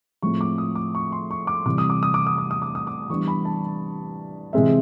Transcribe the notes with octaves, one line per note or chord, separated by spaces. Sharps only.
A2 F3 G#3 C4 C#6
D6
D#6
D6
C#6
C6
C#6
D6
C3 E3 G3 D6
D#6
D6
D#6
D6
D#6
D6
D#6
D6
D#6
D6
E3 G3 B3 D4 C#6
B5
A5
C3 E3 G#3 C4 E5